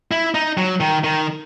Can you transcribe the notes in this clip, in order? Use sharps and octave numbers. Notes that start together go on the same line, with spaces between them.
E4
D#4
F#3
D#3
D#3